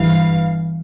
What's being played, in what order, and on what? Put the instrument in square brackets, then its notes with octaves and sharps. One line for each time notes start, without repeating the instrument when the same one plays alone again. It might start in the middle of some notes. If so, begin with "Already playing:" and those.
Already playing: [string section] G1 G2 E3 F5